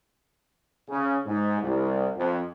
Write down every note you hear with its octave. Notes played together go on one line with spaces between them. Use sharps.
C#3
G#2
C2
F2